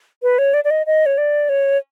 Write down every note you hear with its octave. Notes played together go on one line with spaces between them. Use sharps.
B4
C#5
D5
D5
D#5
D#5
C#5
D5
C#5